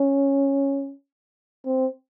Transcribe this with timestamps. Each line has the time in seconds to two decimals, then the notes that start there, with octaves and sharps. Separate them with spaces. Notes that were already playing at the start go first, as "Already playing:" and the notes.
Already playing: C#4
1.66 C4